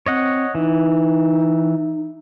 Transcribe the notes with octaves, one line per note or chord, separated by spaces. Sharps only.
C4 C#5 D#5 F#5
E3 D#4